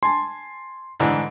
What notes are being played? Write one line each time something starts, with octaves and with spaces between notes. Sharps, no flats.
G#5 A5 C6
G#2 D3 E3